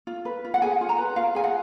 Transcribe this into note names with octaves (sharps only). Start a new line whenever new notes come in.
F4
B4
F4
F#5
G#4 G#5
F4
A#5
B4
F4 F5
G#4 G#5
F#5